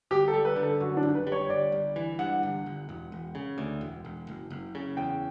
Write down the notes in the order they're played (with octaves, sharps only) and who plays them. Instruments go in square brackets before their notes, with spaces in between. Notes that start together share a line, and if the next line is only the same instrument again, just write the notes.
[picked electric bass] G1 [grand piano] G4
[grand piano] A4
[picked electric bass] G3
[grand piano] B4
[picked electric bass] D3
[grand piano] A4
[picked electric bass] F#2 [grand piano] F#4
[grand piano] D4
[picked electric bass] G1
[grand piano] B4
[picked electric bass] G3
[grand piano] C#5
[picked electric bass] G1 [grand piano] D5
[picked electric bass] G1
E3
[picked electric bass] G2 [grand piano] F#5
[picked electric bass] G1
G1
E1
E1
C#3
D2
E1
E1
F#1
F#1
C#3
[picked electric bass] E2 [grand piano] G5